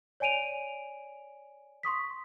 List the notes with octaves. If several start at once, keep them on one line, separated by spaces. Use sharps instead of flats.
C#5 D5 G#5 D7 D#7 F7
C6 C#6 D#6 B6